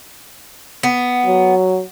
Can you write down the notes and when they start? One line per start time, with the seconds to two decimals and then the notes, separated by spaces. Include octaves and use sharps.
0.83 B3
1.26 F#3